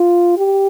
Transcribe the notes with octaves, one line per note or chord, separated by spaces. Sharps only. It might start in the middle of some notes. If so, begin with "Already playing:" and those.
Already playing: F4
G4